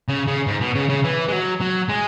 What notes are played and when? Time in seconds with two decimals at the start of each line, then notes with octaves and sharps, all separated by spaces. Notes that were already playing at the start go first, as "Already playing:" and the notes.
0.09 C#3
0.27 C#3
0.47 G#2
0.61 B2
0.75 C#3
0.89 C#3
1.04 E3
1.28 G#3
1.32 F#3
1.61 F#3
1.89 G#3